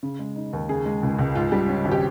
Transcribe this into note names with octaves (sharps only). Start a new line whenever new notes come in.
C#3
G#3
D#4
D#2
C#3 G#4
G#3
C#2
C#2
G#2 F4
G3
C#4
G#1
G4